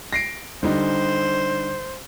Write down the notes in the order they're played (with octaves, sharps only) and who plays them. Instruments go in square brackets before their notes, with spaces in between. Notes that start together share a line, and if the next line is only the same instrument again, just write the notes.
[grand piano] A#6 C7 D7
[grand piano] D3 G3 D#4 [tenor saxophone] C5